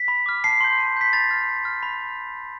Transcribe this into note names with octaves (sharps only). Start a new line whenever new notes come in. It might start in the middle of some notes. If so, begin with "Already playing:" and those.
Already playing: B6
B5
D6 F6
A5 C7
C6 G6
A5
C6 G6 B6
B5 A6
F6
B5
F6
B5